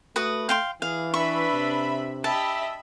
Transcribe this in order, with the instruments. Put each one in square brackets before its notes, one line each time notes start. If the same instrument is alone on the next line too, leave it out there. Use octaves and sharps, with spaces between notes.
[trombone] A3 [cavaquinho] F#4 B4 D#6
[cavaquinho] F5 G5 C6
[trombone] E3 [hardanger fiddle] G#4 [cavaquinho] F5
[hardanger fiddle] D4 B4 [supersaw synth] E5 B5 [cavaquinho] C#6
[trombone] C3
[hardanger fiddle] G4 D#5 [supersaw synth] E5 B5 E6 [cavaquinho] A5